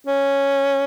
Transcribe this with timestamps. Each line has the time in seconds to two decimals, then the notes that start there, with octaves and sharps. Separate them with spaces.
0.07 C#4